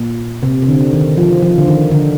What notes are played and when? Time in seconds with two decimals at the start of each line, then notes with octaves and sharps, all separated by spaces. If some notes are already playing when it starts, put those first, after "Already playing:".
Already playing: A#2
0.43 C3
0.62 C3
0.69 D3
0.93 D#3
1.17 F3
1.42 F3
1.58 D3
1.67 D#3
1.91 D3